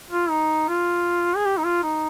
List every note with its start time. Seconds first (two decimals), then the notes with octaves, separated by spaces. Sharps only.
0.11 F4
0.30 D#4
0.69 F4
1.36 G#4
1.46 G4
1.58 D#4
1.65 F4
1.83 D#4